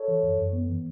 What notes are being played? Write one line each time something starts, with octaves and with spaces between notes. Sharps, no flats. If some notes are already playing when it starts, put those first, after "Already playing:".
Already playing: A4 C#5
E3
F#2
F#2
B3
E3